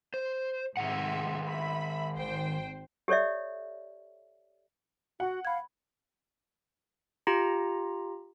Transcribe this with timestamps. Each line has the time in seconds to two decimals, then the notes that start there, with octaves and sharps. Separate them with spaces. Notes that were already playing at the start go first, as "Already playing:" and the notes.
0.14 C5
0.77 G#2 C3 D#3 G#3 E5 F#5
1.45 E5 B5
2.17 G#1 C5 G5
3.08 G4 A4 C#5 D5 E5
5.20 F#4 F#5
5.45 F5 B5 G#6
7.27 F4 G4 A#5